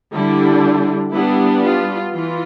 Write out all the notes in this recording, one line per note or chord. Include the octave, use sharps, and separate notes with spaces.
D3 G3 D4 E4
G3 B3 D4 E4
F4
E3 F4